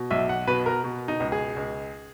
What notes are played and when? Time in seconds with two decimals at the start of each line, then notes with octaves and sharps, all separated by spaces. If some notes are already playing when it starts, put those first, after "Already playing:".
Already playing: B2
0.11 B1 E5
0.29 F#5
0.48 B2 B4
0.66 A#4
0.84 B2
1.08 D#4
1.20 C#2
1.32 G#4
1.56 C#2